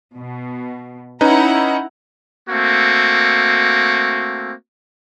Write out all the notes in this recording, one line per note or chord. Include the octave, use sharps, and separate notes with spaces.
B2
C#4 D#4 E4 B4 F#5 A#5
A3 A#3 C4 F#4